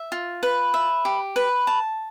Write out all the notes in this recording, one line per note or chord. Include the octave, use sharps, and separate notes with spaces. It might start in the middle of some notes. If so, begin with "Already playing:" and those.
Already playing: E5
F4
B4
E5
G4
B4
A5